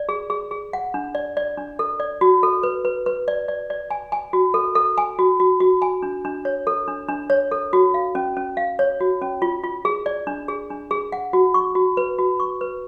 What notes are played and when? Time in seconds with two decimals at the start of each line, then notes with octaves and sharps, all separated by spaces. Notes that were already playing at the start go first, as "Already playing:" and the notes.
Already playing: D5
0.09 G#4
0.30 G#4
0.51 G#4
0.73 F#5
0.94 D4
1.15 D5
1.37 D5
1.57 D4
1.79 A4
2.00 D5
2.21 F#4
2.43 A4
2.63 B4
2.85 B4
3.06 B4
3.28 D5
3.48 D5
3.70 D5
3.91 G#5
4.12 G#5
4.33 F#4
4.54 A4
4.75 A4
4.98 G#5
5.19 F#4
5.40 F#4
5.60 F#4
5.82 G#5
6.03 D4
6.25 D4
6.45 C#5
6.67 A4
6.88 D4
7.09 D4
7.30 C#5
7.51 A4
7.73 F#4
7.94 F5
8.15 C#4
8.37 C#4
8.57 F5
8.79 C#5
9.00 F#4
9.22 C#4
9.42 F4
9.64 F4
9.85 G#4
10.06 D5
10.27 D4
10.48 G#4
10.70 D4
10.91 G#4
11.12 F#5
11.33 F#4
11.54 C#6
11.75 F#4
11.97 B4
12.18 F#4
12.40 C#6
12.61 B4